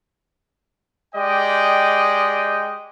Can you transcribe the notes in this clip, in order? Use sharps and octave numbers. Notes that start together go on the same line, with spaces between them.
G#3 G4 D5 D#5 G5